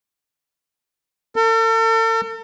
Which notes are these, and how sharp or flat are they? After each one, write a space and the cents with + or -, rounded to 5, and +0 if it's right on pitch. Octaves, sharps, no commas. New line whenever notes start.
A4 +45